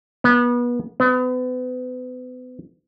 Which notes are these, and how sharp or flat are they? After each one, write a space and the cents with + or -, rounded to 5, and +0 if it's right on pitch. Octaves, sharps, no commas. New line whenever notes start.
B3 -30
B3 +35